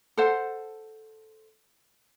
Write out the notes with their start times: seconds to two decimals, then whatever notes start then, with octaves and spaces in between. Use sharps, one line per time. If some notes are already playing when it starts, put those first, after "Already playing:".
0.17 A4 C5 F#5